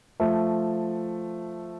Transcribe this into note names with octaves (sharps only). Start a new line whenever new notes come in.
F3 A3